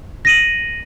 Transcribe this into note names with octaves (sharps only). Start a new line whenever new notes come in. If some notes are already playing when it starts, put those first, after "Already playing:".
A#6 D#7 F#7